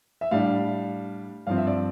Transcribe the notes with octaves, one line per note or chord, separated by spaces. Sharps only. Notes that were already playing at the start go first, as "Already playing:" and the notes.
E5
A2 G3 D4 F5
G2 F3 C4 F5
E5
D5